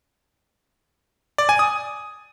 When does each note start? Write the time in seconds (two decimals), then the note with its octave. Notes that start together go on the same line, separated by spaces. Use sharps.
1.38 D5
1.49 G#5
1.59 D#6